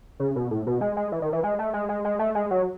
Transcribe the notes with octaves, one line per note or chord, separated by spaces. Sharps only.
C#3
B2
A2
B2
G#3
G#3
E3
D#3
E3
G#3
A3
G#3
G#3
G#3
A3
G#3
F#3